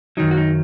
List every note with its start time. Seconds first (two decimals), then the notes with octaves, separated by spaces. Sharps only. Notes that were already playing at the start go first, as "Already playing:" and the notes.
0.17 F#2 D#3 F#3 D#4
0.31 F#4
0.37 D#4